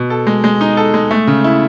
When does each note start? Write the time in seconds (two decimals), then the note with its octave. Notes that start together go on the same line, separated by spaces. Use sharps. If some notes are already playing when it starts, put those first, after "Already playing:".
Already playing: B2
0.10 A4
0.27 G#3
0.44 G#3
0.61 D#4
0.77 A4
0.94 G#3
1.11 A3
1.27 C#3
1.44 E4